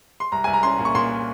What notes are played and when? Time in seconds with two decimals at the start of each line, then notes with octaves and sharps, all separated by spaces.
0.20 C6
0.32 C2 A#5
0.44 C2 G#5
0.53 A#5
0.63 C#4 C6
0.79 A#2
0.85 C#6
0.95 A#2 C6